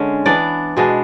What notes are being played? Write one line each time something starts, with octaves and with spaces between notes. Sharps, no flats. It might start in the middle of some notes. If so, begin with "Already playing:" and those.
Already playing: D3 G#3 C#4
E3 B3 D4 D5
B2 G#3 B3 D4